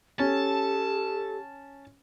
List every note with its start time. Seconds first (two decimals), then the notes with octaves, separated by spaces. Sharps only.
0.19 C#4 G4 A4 A5